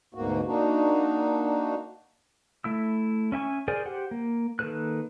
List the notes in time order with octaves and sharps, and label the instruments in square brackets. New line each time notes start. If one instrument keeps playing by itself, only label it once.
[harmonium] D2 G#2 B2 A#3 F#4
A#3 D4 D#4 F#4
[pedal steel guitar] A3 E4 E6
C#4 E5 G#5 C#6
G#4 A#4 C5 D5 G#5
G4 C5 F#5
A#3
D#3 A#3 A4 B4 F#6